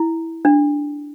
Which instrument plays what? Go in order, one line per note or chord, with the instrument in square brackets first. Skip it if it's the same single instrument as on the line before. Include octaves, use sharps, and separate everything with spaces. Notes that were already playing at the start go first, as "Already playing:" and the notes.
Already playing: [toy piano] E4
D4